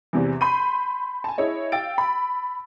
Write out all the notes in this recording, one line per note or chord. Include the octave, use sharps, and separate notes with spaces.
E2 C3 E3
B5 C6 G6 D#7
G#5 A5
E4 G#4 C#5 D#5
F5 G5 E6 A6 D7
B5